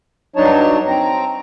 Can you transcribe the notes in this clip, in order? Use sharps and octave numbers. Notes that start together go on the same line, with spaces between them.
G2 F#3 D4 D#4 C#5 A5
C4 A#5